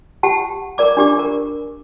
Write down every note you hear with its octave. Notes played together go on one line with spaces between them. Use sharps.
G4 F#5 A5
A#4 D5 D6
D4 G4 D6
A#4